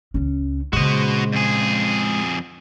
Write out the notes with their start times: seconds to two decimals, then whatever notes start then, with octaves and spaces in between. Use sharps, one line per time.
0.14 C#2 C#4
0.73 A#2 C#3 G#3 F#4 C5 D#5
1.33 F2 G#4